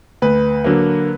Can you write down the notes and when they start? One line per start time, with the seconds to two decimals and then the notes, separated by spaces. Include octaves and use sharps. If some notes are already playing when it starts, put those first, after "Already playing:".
0.22 D2 B4
0.64 D3 F#3 A#3